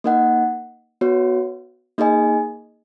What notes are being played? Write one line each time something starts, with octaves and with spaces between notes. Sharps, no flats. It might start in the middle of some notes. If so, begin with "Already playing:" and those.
A#3 D#4 A#4 D#5 F#5
B3 F#4 C#5
A#3 D#4 G#4 D#5 G#5